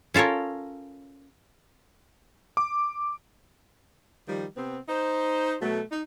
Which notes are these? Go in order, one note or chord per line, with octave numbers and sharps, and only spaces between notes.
C#4 F4 A4 A#4 C#5
D6
D#3 F3 G3
C3 B3 C4
D#4 C5
B2 F#3 A3
D#4